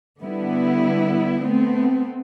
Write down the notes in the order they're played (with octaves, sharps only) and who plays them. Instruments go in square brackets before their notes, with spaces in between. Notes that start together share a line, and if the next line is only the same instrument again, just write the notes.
[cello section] D3 G3 B3 E4
A3 B3 C4